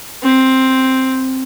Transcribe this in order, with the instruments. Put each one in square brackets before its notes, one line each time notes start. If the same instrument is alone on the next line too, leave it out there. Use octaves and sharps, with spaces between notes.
[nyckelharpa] C4